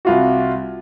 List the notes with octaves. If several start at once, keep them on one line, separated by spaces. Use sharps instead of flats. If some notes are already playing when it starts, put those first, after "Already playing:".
C2 F4 F#4